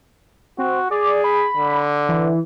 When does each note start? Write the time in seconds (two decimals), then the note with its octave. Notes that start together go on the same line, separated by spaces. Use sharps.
0.58 C4 F#4
0.91 G#4 D5
1.24 B5
1.57 D3
2.09 E3